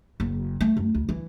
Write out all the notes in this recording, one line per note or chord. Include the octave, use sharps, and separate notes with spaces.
F#1
A3
F#2
D2
E3